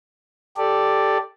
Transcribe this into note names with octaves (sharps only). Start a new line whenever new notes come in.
G4 A4 D5